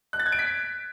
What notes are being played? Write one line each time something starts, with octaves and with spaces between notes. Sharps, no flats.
F#6
A6
G#6
D7
B6